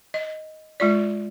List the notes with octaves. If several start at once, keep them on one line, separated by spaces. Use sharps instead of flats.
D#5
G#3 F4 D5